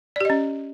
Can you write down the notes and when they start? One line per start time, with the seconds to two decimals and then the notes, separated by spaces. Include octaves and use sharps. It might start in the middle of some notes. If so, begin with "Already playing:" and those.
0.16 D5
0.20 G4
0.25 D#5
0.30 C#4